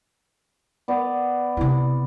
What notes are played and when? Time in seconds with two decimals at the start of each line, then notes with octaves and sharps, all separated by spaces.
0.88 B3 D5
1.57 C3 E4